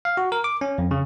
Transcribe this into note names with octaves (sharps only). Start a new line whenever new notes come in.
F5
F#4
A#4
D6
C#4
F2
C#3